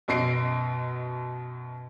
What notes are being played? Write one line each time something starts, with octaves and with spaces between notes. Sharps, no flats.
F#2 B2 D#5 C7 D7